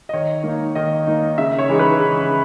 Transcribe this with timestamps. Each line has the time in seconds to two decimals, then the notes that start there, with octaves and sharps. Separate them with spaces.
0.09 D#5
0.13 D#3 C#5
0.44 A#3 D#4
0.75 D#3 D#5
1.07 A#3 D#4
1.38 C#3 E5
1.59 C#5
1.69 E3 G#3 D#4
1.79 B4
2.00 C#3